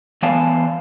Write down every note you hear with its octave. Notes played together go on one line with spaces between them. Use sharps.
E3 B3 D5 F5 G#5 A5